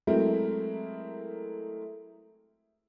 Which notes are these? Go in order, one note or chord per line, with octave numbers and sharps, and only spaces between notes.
F#3 G#3 A3 C4 E4 A#4